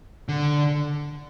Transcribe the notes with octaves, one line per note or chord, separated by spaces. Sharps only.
D3